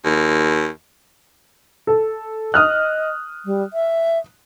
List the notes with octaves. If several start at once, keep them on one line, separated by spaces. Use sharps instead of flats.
D#2
A4
D#5 D#6 F6 F#6
G3
E5